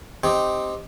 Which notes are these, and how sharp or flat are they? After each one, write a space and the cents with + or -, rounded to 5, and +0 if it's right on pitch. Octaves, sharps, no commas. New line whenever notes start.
C4 +0 D#4 +0 G4 +0